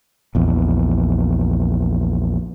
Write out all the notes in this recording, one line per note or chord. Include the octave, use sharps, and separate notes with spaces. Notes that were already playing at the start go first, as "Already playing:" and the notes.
A#1 E2